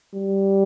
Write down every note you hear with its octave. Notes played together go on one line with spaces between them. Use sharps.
G3